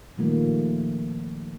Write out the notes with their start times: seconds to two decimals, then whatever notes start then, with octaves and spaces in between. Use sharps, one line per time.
0.18 A#2 D#3 F3 G3 A3 A#3